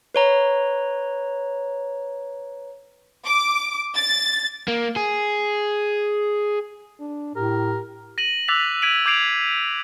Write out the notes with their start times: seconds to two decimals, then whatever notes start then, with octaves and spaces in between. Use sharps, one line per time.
0.15 B4 C#5 A#5
3.25 D6
3.96 A6
4.68 A#3
4.96 G#4
7.00 D4
7.36 A2 G4 A#4
8.18 A#6 D#7 F#7
8.48 D6 E6 F#6 A6 B6 F7
8.82 G#6 B6 D7 D#7 F#7
9.06 D6 G6 G#6 C7 D7 F7